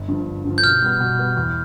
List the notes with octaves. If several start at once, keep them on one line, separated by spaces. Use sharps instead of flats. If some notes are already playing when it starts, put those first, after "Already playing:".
Already playing: G1
G2 D3 F3
G1
G2 D3 F3
G6
B2 F6
G3 B3
B2
G3 B3
E2